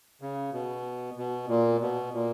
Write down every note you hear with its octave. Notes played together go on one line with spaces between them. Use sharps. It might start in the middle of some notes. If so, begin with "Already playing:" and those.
C#3
B2
B2
A#2
B2
A#2